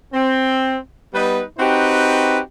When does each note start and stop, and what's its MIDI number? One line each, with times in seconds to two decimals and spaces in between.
0.13 0.76 60
1.14 1.41 55
1.14 1.41 59
1.14 1.41 63
1.14 1.41 71
1.58 2.39 60
1.58 2.39 63
1.58 2.39 66
1.58 2.39 67
1.58 2.39 71